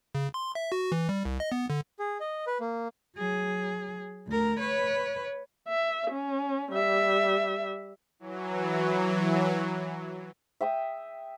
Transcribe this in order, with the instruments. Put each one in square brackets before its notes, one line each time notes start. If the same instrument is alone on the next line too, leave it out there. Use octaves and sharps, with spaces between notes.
[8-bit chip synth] C#3
C6
E5
F#4
E3
G3
C2
D#5
B3
D3
[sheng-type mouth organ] G#4
D#5
B4
A#3
[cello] F#3 G#4
D2 A#4
B4 C#5
[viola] E5
C#4
G3 E5
[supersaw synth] E3 F#3
[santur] E5 G5 D#6 E6